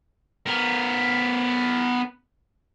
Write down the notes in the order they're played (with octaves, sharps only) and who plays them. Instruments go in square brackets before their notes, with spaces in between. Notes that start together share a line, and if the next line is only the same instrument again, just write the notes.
[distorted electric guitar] B3 A#4